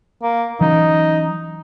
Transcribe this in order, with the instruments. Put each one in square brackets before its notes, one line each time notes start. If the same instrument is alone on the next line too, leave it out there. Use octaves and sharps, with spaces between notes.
[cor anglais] A#3
[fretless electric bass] E3 F#3 C#4 [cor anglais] D#4